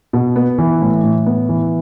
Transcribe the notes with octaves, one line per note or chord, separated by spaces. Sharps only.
B2
B3
E3
A2
A2
B3
E3